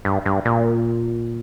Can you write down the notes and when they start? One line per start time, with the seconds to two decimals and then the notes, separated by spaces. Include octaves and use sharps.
0.05 G2
0.26 G2
0.45 A#2